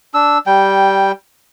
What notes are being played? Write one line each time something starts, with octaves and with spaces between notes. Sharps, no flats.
D4 E6
G3 G5